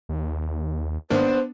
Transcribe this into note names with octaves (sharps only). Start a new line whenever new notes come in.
D#2
G#2 D#3 A#3 B3 D4 C5